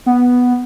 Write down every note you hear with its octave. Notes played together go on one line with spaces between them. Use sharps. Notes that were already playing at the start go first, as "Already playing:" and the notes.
B3